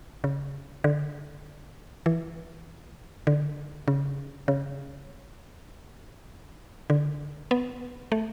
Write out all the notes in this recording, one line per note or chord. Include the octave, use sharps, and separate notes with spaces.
C#3
D3
E3
D3
C#3
C#3
D3
B3
A3